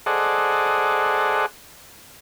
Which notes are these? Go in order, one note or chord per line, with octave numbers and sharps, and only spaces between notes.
G#4 A4 C5 D5 D#5 F#5